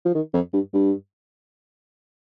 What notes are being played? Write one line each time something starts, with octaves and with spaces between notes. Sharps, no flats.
F3
D#3
F2
G2
G2